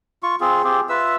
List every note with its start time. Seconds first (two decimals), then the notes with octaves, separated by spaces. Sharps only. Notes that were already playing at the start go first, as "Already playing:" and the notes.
0.23 F4 C#6
0.40 C4 F4 G#4
0.64 C4 F4 G4 G#4
0.89 F4 B4 E5 E6